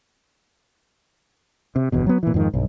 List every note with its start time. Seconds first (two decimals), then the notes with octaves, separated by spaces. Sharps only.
1.76 C3
1.92 G1 E2 B2
2.07 F#3 B3
2.23 A#2 E3
2.34 F2 G#2 D#3
2.54 B1 G2